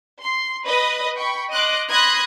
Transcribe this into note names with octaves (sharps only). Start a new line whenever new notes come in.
C6
B4 D#5 D#6
G5 B5 C#6
D#5 C6 D6 F#6
B5 C6 D#6 F#6 G#6 A#6